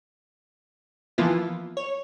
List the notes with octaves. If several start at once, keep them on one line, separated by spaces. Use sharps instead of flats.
E3 F3 A#3 B3 E4 F4
C#5